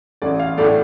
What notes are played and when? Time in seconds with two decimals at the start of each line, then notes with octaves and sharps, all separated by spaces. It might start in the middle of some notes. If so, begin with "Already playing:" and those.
0.22 A1 D5
0.39 F5
0.57 A2 A3 D5